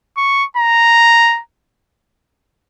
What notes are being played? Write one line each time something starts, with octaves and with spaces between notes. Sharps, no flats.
C#6
A#5